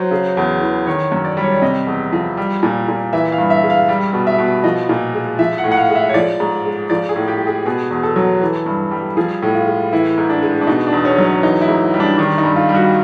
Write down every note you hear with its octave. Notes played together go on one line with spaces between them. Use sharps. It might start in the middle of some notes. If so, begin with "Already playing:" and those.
Already playing: F#3 C5
C#3
E2
E3
D#3 C#5
F#2
D5
G3
C#5
D5
C3 D#5
E2
F3
G3
A#2
A#2
E3 E5
F5
G2
E5
G#3
F5
G3
B2
E5
B2
F3 D#5
A#2
G#3
F3 E5
F#5
A2
F#5
F5
G#3
E5
C#5
F3 D5
G#2
G#3
F3 D5
G#4
A2
G4
G#3
G#4
B2 G#4
E2
A4
F#3
E3
G2
G3
F3 G#4
A2
F4
G#3
E3 E4
G#2
D4
G#3
D4
B2 D#4
D4
E2
C#4
F#3
C#4
E3 D#4
E4
G#2
G3
D4
D#3 D4
D#4
G2
F4
G3
F#4